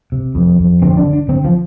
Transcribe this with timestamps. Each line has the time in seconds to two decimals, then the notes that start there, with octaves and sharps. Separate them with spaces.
0.12 C3
0.35 F2
0.59 F2
0.82 D3 C4
0.97 D4
1.05 D3
1.13 D4
1.28 D3 C4
1.45 F3